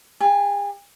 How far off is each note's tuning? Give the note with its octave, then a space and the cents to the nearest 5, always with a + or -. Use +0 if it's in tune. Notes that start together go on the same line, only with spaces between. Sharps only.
G#4 -45 G#5 +35